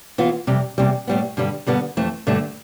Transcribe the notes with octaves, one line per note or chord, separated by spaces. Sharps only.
E3 B3 F4
F2 C3 G3
E2 C3 G3
A2 G3 B3
G2 D3 G3
G2 D3 G3 B3
F2 E3 A3
G2 D3 A3